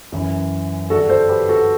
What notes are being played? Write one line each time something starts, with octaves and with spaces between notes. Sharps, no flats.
F#2 E3
G2 D3 F#4 A4
A4 C5
G4 B4
F#4 A4